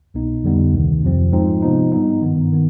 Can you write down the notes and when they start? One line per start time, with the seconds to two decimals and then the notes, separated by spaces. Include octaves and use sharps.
0.14 C2 B2 B3 D#4
0.44 F2 D3 G3 B3 D#4
0.73 D2 C3 D#3
1.03 F2 C3 F3 C4
1.32 G#2 F3 G#3 C4 D#4
1.62 C3 F3 B3 D#4
1.92 G#2 G3 B3 D#4
2.22 G2 D#3 B3
2.53 D#3 B3